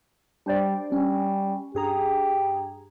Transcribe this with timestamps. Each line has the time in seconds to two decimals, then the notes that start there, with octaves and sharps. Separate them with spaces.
0.46 G3 D4 C5 D5
0.92 G3 C#4
1.75 G2 G4 G#4 A#5